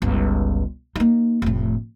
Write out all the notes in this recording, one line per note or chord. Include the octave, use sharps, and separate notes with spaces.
G1 C#2
A#3 D#4
F1 A2